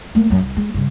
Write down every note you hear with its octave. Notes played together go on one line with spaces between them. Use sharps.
A3 A#3
F#2 F#3
C2
G#3
G2 C#3